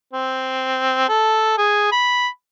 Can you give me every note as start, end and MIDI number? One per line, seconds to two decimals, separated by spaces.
0.13 1.05 60
1.08 1.55 69
1.58 1.91 68
1.92 2.28 83